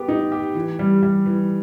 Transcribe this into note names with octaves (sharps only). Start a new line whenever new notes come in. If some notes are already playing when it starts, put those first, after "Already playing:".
Already playing: B3 G4
D#4
G4
E3
G3
G3
E3